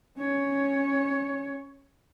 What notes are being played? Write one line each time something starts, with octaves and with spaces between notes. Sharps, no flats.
C#4 C#5